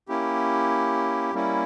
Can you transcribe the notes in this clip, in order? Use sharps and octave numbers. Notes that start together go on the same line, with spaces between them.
A#3 C#4 E4 G4
G3 A#3 C#4 E4